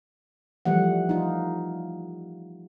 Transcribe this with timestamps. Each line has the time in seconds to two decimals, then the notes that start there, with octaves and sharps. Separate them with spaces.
0.65 E3 F3 G3 A3 F#5
1.09 D#4 F4